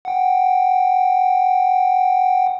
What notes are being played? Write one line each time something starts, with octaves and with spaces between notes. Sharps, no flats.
F#5 G5